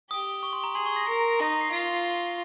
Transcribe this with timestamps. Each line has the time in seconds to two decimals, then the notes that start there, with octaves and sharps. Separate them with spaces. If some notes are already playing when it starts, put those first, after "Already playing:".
0.11 G4 D#6
0.43 C#6
0.53 C6
0.64 A#5
0.75 G#4 C6
0.86 C#6
0.96 A#6
1.07 A#4 C7
1.39 D#4 A#6
1.61 C7
1.71 F4